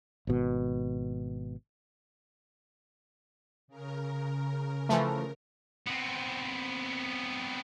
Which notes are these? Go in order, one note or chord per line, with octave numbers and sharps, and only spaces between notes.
G#1 B2
C#3 A#4
E3 F3 A3
B3 C4